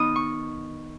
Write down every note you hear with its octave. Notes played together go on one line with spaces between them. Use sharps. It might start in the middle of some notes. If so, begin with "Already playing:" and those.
Already playing: D#3 B3 D#4 D#6
C#6